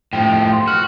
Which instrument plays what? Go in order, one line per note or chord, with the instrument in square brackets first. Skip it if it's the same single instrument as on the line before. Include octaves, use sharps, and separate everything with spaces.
[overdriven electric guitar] A2 F3 [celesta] G5
[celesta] C6
[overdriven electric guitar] F#4 [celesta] F6